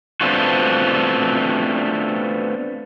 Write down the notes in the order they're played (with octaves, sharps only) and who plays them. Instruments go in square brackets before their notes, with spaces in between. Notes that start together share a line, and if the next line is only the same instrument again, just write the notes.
[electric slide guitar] A3 B3 C4 D4 F4 F#4